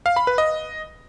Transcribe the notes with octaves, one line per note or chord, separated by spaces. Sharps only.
F5
B5
B4
D#5